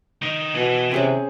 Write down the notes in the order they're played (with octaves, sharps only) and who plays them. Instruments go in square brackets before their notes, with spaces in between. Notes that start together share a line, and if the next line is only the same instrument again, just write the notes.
[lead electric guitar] D#3 D#4
[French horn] B2 [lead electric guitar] E3
[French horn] C3 [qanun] C#4 G#4 C5